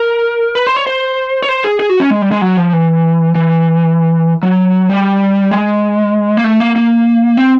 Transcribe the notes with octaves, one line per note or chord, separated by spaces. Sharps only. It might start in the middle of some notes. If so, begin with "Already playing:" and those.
Already playing: A#4
B4
C5
C#5
C5
C#5
C5
G#4
G#4
F#4
C#4
G#3
G3
G#3
F#3
F3
E3
E3
F#3
G3
G#3
A#3
A3
A#3
A#3
C4